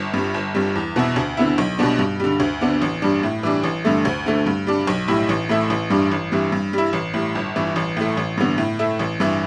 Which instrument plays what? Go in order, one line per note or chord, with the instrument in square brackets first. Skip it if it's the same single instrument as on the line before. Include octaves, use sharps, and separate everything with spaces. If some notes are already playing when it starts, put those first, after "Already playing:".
Already playing: [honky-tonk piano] G1
G2 G3
G1
G2 G3
E2
B2 B3 E4
D2
D3 B3 E4
B1
B2 G3 B3 D4
G2
D3 G3
D2
D3 B3 D4
A1
G2 G3 D4
A2
E3 G3 D4
A1
G2 D3 A3
D2
D3 A3
G2
G3 D4
B1
A2 G3 E4
A1
A2 A3 E4
A1
G2 G3 D4
A1
G2 E3 G3
G2
G3 E4
A1
A2 G3
G1
G2 E3
A1
A2 A3
A1
G2 D3 B3
A2
A3 E4
A1
G2 E3